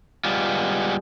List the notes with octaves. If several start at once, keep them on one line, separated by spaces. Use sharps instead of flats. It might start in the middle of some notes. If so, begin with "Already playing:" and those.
G3 G#3 B3 F4